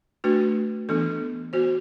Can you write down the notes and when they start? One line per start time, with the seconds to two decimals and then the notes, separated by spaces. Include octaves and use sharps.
0.24 A3 D4 F#4 B4
0.89 E3 B3 D4 A4
1.53 B3 F#4 C5